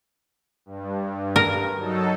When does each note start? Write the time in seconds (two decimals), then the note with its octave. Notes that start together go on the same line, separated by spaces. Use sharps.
0.66 G2
1.36 A#4
1.77 F#3 D#4 A4